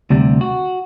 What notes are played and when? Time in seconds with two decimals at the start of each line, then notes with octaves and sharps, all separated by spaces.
0.10 D2 C3 G3
0.41 F#4